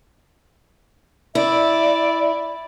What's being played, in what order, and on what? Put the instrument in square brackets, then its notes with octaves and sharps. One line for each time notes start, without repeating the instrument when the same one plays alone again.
[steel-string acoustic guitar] E4 [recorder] D5 [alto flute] E5